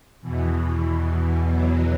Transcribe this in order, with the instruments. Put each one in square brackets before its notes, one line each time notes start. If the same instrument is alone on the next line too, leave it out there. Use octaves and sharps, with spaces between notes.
[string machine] E2 B2 E3
F#3